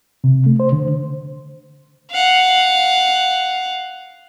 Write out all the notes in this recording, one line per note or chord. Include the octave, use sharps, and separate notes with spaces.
C3
A3
C5
D3
F5 F#5